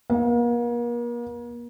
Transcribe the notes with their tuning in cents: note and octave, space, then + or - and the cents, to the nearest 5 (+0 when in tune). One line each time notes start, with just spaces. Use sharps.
A#3 +40